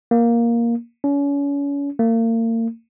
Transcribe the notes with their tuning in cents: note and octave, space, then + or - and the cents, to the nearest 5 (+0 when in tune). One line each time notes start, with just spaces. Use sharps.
A#3 +5
C#4 +35
A#3 -40